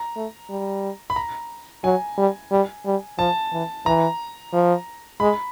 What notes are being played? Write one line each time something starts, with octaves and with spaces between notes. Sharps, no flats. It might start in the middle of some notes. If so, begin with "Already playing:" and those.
Already playing: A#5
A3
G3
B5
A#5
F#3 G#5
G3
G3
G3
F3 A5
E3
E3 A#5
F3
G#3 B5